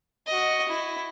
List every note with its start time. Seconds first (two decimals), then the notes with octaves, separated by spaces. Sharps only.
0.27 F#4 D#5
0.69 E4